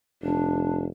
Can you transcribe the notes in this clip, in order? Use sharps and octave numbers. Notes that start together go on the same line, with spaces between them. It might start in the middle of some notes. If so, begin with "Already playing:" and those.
F1 D4